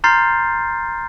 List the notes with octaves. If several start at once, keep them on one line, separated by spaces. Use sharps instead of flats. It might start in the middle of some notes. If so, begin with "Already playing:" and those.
A#5 C6 F6 G6 A6 C7